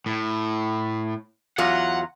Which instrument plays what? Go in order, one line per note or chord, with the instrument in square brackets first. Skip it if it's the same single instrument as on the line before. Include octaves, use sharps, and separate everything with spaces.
[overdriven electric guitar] A2
[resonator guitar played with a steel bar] E2 F#3 F4 [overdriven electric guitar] F#5